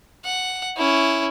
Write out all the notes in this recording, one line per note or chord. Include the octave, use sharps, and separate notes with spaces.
F#5
C#4 E4